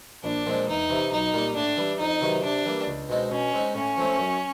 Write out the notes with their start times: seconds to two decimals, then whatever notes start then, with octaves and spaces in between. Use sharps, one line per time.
0.24 A#1 D4
0.46 A#2 F3 G#3 C4
0.68 E2 D#4
0.89 C3 E3
1.12 B1 D#4
1.34 A#2 G3 A#3
1.56 A2 D4
1.77 E3 G3
2.00 F2 D#4
2.21 C3 D#3 F#3 B3
2.44 C3 D4
2.65 E3 G3 A#3
2.88 C#2
3.09 B2 G#3 C4 D#4
3.31 B2 C#4
3.54 G#3 C4 D#4
3.75 A2 C#4
3.97 F3 A3 C4
4.18 F#2